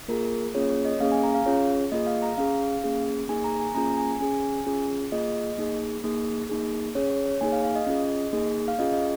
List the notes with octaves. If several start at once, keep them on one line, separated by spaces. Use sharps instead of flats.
A#3 F4 G#4 A#4
A#3 C#4 F4 G#4 C#5
C#5
D#5
A#3 C#4 G#4 F5
G#5
A#5
F5
C#4 F4 G#4 C#5
A#3 F4 G#4 D#5
F5
A#5
C#4 G#4 F5
A#3 C#4 G#4
A#3 D#4 G#4 G#5
A#5
G#5
A#3 C#4 F4 G#4 A#5
G#5
C#4 G#4 G#5
C#4 F4 G#4
A#3 F4 G#4 D#5
A#3 D#4 G#4
A#3 D#4 G#4
A#3 D#4 G#4
C#4 G#4 C#5
C#5
C#5
A#3 D#4 G#4 G#5
F5
F5
D#5
C#4 F4 G#4
A#3 D#4 G#4
F5
C#4 F4 G#4 D#5
D#5